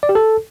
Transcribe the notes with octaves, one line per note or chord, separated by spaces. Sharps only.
D5
G4
A4